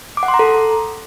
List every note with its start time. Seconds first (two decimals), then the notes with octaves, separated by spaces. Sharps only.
0.17 D6
0.23 F#5
0.28 C6
0.34 A#5
0.39 A4